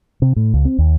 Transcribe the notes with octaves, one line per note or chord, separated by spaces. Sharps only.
C3
A2
C#2
C4
D#2